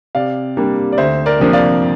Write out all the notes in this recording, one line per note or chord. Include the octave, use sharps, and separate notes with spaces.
C3 D5 F5
G3 A#3 D4
D5
D2 C5 E5
A#4 D5
C3 F3 A#3 D4
D5 F5